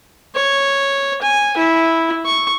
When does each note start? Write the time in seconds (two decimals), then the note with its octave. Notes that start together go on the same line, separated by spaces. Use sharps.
0.35 C#5
1.22 G#5
1.57 E4
2.26 C#6